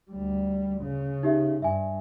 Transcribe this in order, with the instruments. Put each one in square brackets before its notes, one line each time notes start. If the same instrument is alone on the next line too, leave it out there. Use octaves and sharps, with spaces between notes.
[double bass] D2 G3
C#3
[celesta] D#4 G4 E5
[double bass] G2 [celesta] E5 G#5